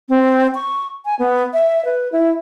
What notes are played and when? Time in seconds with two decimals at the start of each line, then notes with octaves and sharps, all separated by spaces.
0.09 C4
0.55 C#6
1.05 G#5
1.19 B3
1.53 E5
1.85 B4
2.12 E4